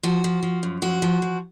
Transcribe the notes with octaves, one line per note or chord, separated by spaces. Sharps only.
F3 F#4
F3
F3
F#2
F3 F#4
F3
F3